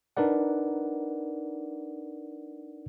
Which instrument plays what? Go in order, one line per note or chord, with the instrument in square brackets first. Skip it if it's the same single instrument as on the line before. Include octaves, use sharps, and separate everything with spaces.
[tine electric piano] D4 D#4 A#4 B4 D5 F#5